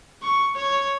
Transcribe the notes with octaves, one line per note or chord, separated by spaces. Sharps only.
C#6
C#5